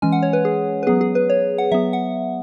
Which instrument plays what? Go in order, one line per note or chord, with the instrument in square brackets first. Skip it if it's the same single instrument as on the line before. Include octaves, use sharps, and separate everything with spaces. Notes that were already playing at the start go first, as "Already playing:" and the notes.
[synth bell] E3 G#3 C#4 G#5
F#5
C#5
B4
G#4
B4
F#3 B3 G#4
G#4
B4
C#5
F#5
F#3 B3 E5
F#5